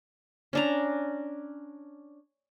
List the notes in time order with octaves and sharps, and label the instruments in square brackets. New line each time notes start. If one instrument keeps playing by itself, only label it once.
[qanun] C#4 D4 A#5